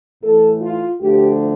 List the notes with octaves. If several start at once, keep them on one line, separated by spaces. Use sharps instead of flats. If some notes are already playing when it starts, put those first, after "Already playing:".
A2 E3 A3 A4
F4
D2 D3 F3 A3 G4